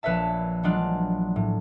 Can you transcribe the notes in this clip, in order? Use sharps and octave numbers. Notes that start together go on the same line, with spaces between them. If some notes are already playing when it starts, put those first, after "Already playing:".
A#1 B4 C#5 E5 A5
E3 F#3 G#3 D4 F4
A2